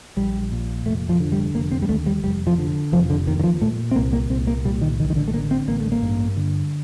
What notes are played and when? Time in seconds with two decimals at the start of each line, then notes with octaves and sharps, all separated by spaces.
0.16 A#1 G3
0.52 A#2
0.86 F1 A3
1.09 F3
1.20 D3
1.32 G3
1.54 F1 A#3
1.72 C4
1.82 G3
1.89 D#2 A3
2.06 G3
2.23 F1 G3
2.47 F3
2.58 D3
2.92 F1 F3
3.10 D3
3.27 D#2 D#3
3.40 D#3
3.44 F3
3.61 A#2 A3
3.91 C4
3.96 C2 A#3
4.13 A#3
4.30 C2 C4
4.47 A#3
4.65 A#2 G3
4.81 D#3
4.99 A1 D#3
5.10 D#3
5.16 D3
5.28 A3
5.34 D3 A#3
5.51 C4
5.68 A1 A#3
5.80 A3
5.92 A#3
6.02 G2
6.37 D3